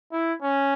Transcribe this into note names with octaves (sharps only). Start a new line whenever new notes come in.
E4
C#4